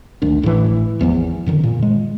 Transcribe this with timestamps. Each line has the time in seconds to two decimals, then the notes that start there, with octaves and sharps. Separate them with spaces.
0.22 F#1 D2 D#3 D4
0.42 G#1 A2 D3 E3
0.99 G#1 E2 F3 B3
1.46 F#2 D3 D#3
1.64 A#2
1.83 G#3